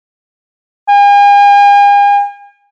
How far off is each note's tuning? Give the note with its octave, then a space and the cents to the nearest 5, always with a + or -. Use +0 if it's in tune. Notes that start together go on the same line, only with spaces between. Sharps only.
G#5 -45